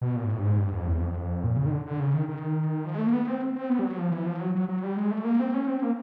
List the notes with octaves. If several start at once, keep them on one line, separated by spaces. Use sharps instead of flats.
B2
A#2
G#2
A2
G2
G#2
G2
F2
E2
F2
A#2
C#3
D#3
D3
D3
C#3
D#3
D#3
F3
G#3
A3
A#3
B3
C4
C4
B3
G3
F#3
F3
E3
F3
F#3
F#3
F#3
G3
G#3
A3
A#3
C4
C#4
C4
A#3